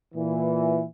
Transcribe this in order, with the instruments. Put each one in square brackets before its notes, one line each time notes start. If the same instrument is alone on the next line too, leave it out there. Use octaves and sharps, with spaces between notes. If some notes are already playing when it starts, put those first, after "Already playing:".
[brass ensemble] A#2 E3